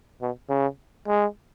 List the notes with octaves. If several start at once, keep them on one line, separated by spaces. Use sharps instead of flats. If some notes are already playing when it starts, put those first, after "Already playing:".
B2
C#3
G#3